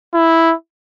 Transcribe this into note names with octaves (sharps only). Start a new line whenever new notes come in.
E4